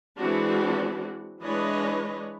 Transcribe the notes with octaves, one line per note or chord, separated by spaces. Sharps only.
E3 G#3 C4 D4 F#4
E3 G#3 D4 B4 C#5 D#5